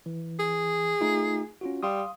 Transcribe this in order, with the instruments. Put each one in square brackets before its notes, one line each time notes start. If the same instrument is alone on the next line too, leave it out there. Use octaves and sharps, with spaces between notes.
[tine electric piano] E3
[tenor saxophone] G#4
[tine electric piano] A3 D#4 F4
C#4 F4 F#4
[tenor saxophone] G3 [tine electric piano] F5 C6 D#6